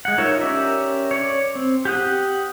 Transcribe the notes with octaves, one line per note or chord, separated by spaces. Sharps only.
G#3 F#5
D#4 F4 A#4 C#5 E5
C#4 G4 A#4 D5 E5
C#5 D5
C4
G4 F#5 D#6